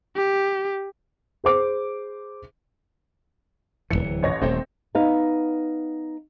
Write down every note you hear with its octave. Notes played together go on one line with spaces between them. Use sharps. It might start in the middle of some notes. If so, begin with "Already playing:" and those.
G4
G#4 C5 D6
D1 C#2 E3 C#7
A1 C#5 A#6
D#1 D#2 A3 C4
B3 D#4 F5